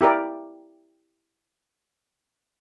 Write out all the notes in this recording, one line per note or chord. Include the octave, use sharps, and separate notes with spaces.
E4 G4 A#4 D5